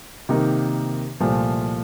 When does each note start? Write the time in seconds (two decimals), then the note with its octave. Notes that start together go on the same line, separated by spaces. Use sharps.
0.29 C3 D#3 A#3 D#4
1.20 C2 A#2 F3 A3